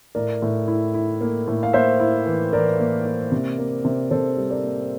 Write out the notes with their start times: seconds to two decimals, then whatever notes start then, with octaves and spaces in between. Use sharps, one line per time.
0.15 A2 A#4 D5
0.42 A2
0.68 E4
0.94 E4
1.21 A#3
1.47 A2
1.63 F5
1.73 A#3 C5 E5
2.00 E4
2.26 E3
2.53 E3 A#4 D5
2.79 A#3
3.06 A#3
3.32 C3
3.58 A#3
3.85 C3
4.11 C3 A4 C5
4.37 G3
4.50 A#4 D5
4.64 A#3